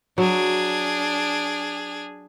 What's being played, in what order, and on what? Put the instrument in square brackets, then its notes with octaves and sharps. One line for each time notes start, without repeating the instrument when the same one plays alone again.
[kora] F#3 [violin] D4 G#4